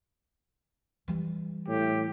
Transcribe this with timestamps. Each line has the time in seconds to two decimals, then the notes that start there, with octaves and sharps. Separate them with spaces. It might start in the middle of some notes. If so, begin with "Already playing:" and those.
1.08 E3 G3
1.68 A2 G4